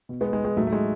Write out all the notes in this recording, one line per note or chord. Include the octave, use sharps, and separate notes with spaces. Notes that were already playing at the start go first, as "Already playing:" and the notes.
B2
G#3 B3
G#3
G#3
A2 F#3 A3
A3
G#3